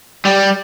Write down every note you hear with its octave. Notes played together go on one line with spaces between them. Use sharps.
G3